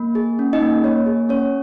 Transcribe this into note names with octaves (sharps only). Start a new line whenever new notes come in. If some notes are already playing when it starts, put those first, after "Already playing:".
Already playing: A#3
G#4
C#4
D#4 D#5
A#3
A#3 C#5
G#4
C#4 C#5